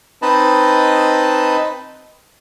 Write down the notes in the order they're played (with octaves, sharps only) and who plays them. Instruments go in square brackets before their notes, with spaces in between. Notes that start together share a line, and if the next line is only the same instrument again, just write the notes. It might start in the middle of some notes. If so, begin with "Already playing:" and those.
[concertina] C4 D#4 B4 D#5 A5 B5